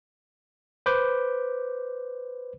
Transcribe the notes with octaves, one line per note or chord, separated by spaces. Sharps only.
B4 C5 B5 D6 G6